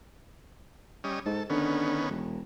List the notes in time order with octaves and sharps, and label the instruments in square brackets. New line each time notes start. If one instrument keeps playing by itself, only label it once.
[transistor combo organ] G3 C#4 D#5
[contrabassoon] G#2 [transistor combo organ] A4
[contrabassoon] D3 [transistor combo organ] D#3 B3 C#4
[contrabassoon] E1